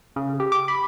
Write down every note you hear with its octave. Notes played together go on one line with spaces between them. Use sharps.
C#3
G4
D6
B5